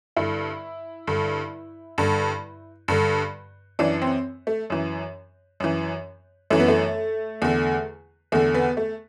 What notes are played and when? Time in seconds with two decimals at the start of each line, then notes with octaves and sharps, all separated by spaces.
0.16 G2 D3 E4
1.07 G2 D3
1.98 G2 D3
2.88 G2 D3
3.79 F#2 E3 D4
4.02 C4
4.47 A3
4.70 F#2 E3
5.60 F#2 E3
6.50 F#2 E3 A3
6.60 B3
6.68 A3
7.42 E2 D3
8.32 E2 D3 A3
8.54 B3
8.77 A3